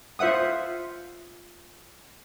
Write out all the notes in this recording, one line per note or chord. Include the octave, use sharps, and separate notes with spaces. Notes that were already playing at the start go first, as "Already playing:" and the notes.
F4 C5 E5 F#5 D#6